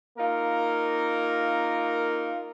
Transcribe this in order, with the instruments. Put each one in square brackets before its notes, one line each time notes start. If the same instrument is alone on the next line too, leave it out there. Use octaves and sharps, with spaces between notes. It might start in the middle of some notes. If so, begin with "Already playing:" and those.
[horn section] A#3 D#4 F4 A#4